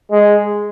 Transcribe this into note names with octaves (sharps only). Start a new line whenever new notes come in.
G#3